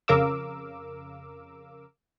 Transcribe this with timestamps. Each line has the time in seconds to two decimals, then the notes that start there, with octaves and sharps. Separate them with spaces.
0.08 F2 C#3 A#4 F5 D6 E6